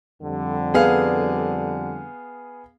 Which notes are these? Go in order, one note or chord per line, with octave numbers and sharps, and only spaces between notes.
F2 D3 G3
B3 G#4 F5